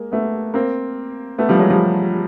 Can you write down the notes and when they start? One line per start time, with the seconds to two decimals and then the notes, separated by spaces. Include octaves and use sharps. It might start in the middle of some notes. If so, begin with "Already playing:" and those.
Already playing: G#3 A#3
0.12 A3 B3
0.54 A#3 C4
1.38 A3 B3
1.49 F3 G3
1.59 F#3 G#3
1.70 F3 G3